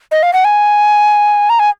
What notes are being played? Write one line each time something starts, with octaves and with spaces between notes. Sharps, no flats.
D#5
F5
F#5
G#5
A#5
G#5